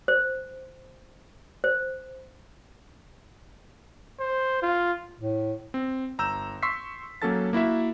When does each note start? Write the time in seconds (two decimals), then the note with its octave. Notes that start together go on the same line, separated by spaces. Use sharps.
0.08 C5
1.64 C5
4.19 C5
4.62 F4
5.20 A2
5.74 C4
6.18 G1 A#5 E6 G6 E7
6.62 C6 C#6 E6 B6 C7
7.22 F#3 A#3 C#4 A4 A5 A6
7.53 A#3 E4 F#4 E5